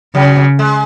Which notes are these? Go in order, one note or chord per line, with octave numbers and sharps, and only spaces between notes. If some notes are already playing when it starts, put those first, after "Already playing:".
C#3 F#3
G#3